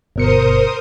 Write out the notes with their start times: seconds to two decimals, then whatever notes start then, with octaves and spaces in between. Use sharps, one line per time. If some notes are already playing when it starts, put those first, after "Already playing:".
0.16 G1 B2 A#4 C5 D#6 C#7